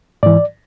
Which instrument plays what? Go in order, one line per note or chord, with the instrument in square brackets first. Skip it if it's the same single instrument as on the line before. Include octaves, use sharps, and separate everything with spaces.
[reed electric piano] G#2 E3 D5